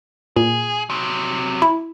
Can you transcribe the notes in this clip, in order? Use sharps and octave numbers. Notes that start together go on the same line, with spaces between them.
A#2 G#4
C3 F#3
E4